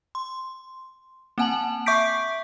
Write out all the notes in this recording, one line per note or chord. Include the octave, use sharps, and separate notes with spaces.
C6
A#3 C4 F#5 G#5 A5 F#7
E5 C#6 D6 G6 B6 D7